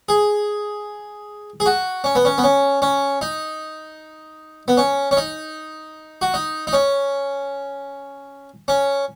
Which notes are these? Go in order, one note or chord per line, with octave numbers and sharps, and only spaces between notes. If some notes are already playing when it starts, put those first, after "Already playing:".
G#4
G#4
F#4
C#4
B3
C#4
B3
C#4
C#4
D#4
B3
C#4
C#4
D#4
F#4
D#4
D#4
C#4
C#4